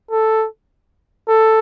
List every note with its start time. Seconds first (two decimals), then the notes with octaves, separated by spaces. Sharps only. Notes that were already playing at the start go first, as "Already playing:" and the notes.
0.11 A4
1.28 A4